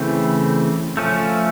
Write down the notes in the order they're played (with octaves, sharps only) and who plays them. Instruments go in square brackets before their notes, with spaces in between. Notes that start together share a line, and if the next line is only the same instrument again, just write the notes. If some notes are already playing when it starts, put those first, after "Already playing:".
Already playing: [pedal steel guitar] C#3 E3 A3 C4
F3 A3 C#4